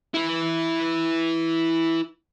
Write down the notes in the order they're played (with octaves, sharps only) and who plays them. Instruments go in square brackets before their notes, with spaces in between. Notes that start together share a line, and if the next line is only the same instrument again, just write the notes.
[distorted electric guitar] E4 B4